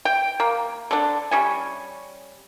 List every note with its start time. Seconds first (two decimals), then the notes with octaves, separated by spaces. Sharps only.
0.05 G5
0.40 A#3
0.91 D3 D4
1.31 G3 C#4 G#5